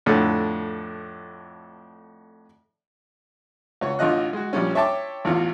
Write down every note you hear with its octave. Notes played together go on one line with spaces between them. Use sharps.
F2 A2 D3
C#2 C#5 F#5
A1 D3 F4 D#5 F#6
G#3 F#4
A#1 G3 C#4
C#5 E5 G5 A5 C6 D6
A1 E2 F4